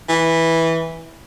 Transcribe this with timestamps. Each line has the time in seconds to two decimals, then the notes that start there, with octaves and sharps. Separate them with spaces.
0.09 E3